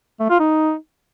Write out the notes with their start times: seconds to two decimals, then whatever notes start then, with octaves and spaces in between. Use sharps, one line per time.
0.20 A3
0.30 F4
0.40 D#4